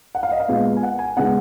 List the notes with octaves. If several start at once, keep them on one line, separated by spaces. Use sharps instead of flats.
F#5
F5
D#5
F5
A#2 G#3 B3
G#5
F#5
G#5
C#3 G#3 B3 F#5